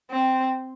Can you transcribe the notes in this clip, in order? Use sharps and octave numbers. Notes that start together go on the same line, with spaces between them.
C4